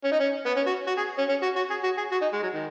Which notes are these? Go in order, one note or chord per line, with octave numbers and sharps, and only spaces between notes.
C#4
D#4
C#4
B3
C#4
F#4
F#4
G#4
C#4
C#4
F#4
F#4
G#4
F#4
G#4
F#4
D#4
G#3
F#3
D#3